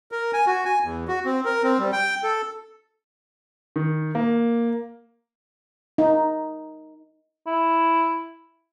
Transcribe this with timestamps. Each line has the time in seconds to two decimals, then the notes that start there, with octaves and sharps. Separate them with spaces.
0.12 A#4
0.33 G#5
0.47 F#4
0.65 G#5
0.83 E2
1.08 F#4
1.25 C4
1.45 A#4
1.63 C4
1.79 G3
1.92 G5
2.23 A4
3.76 D#3
4.15 A#3
5.98 D#4
7.47 E4